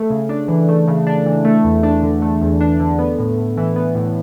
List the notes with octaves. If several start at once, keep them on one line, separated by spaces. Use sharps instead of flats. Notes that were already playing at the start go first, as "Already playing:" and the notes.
Already playing: A3
C#3
D4
E3
A3
C#3
D4
E3
A3
E2
D4
D3
A3
E2
D4
D3
B3
A2
A2
E3
B3
A2